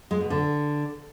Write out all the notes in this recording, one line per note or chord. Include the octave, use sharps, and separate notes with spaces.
G#3
B2
D3